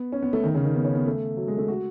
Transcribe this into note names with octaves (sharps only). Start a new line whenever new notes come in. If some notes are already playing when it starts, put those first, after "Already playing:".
Already playing: B3
C#4
B3
A3
D#3
C#3
D#3
B3
C#4
B3
A3
F#3
G#3
A3
F#4